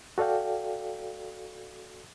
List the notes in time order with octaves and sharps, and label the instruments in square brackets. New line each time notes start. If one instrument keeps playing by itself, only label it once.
[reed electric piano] F#4 A4 D5 F5 G5